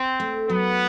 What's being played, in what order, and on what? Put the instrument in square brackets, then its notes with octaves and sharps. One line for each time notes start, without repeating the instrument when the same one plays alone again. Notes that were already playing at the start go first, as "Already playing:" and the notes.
Already playing: [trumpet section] C4
[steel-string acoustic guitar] A3
[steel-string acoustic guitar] F#3 [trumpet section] B3